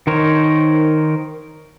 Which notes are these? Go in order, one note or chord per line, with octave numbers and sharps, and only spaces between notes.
D#3 D#4 A#4 C5 C#5